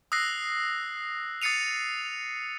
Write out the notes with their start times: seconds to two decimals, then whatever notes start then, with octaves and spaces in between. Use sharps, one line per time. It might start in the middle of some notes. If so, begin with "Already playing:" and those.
0.12 D#6 E6 F#6 A#6 C7
1.42 D#6 A6 C7 C#7 D#7 F7